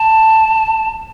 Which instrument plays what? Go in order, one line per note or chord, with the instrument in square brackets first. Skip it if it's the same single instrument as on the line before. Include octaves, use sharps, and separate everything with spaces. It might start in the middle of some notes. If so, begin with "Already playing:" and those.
Already playing: [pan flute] A5